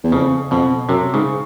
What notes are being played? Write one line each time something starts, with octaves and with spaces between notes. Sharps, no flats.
E2
F2 C#3
F2 B2
F#2 C3
G#2 C#3